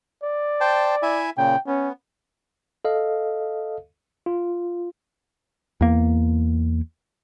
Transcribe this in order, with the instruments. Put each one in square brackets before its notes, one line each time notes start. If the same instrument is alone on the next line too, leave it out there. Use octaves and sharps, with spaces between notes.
[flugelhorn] D5
[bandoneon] C5 G5 A5
E4 E5 G#5
[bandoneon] A#2 C#3 [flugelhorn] G5
[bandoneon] B3 [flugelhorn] C#4
[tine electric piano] A4 D#5 F5
F4
[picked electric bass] E2 A#3